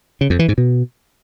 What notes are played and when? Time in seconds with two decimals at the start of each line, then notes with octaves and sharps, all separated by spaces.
0.21 C#3
0.30 F2
0.39 E3
0.48 G#2
0.58 B2